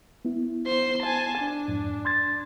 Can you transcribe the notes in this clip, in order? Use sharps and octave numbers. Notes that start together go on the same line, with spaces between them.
B3 E4
C5 C6
G#5 A5
D4
F2 G#2
C6 G#6 A6